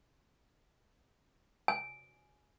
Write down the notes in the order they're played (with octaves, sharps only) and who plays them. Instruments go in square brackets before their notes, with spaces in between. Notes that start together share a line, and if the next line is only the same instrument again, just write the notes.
[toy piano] G#5